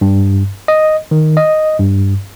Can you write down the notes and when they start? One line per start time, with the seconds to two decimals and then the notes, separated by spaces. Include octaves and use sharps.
0.01 G2
0.68 D#5
1.11 D#3
1.37 D#5
1.79 G2